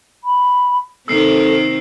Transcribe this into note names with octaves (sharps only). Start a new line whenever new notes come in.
B5
C3 D#3 C4 A4 E6 C7